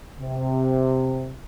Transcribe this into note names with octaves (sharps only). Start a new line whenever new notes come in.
C3